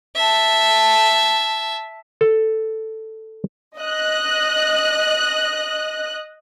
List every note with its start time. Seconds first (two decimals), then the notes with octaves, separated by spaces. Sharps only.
0.15 E5 A5
2.21 A4
3.78 D#5 F#6